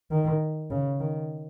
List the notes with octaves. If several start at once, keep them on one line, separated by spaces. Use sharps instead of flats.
D#3
C#3
D#3